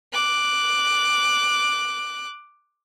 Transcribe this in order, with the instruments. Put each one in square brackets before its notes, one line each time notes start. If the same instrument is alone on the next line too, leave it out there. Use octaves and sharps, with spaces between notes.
[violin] D6 F#6